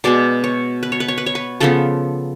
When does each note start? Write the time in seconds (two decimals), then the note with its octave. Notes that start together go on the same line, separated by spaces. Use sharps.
0.04 B2 G#3 B3 D5
0.44 C#5
0.83 B4
0.92 C#5
1.00 B4
1.08 C#5
1.18 B4
1.26 C#5
1.35 B4
1.60 C#3 F3 B3 A4